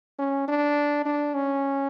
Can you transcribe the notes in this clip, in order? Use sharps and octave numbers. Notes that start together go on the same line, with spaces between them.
C#4
D4
D4
C#4